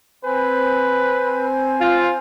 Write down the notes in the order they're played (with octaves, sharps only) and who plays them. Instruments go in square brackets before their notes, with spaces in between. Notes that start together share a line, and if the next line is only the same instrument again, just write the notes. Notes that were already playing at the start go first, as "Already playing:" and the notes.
[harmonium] C4 C5 G#5 [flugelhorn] B4
[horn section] F4